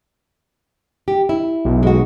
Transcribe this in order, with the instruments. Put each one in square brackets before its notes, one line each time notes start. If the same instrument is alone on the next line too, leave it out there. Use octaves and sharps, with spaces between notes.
[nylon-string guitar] G4
E4
[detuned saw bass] B1
[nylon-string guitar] G#3 F#4